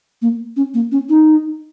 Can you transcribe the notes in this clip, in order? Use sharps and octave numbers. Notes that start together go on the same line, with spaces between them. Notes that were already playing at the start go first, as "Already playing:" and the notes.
A#3
C#4
A#3
C#4
D#4